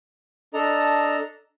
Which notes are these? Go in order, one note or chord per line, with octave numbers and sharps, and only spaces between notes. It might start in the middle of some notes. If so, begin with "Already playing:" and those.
D4 A4 D#5 A#5